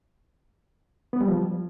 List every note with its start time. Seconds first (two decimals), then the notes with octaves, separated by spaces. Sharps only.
1.13 B3
1.21 G3
1.28 F3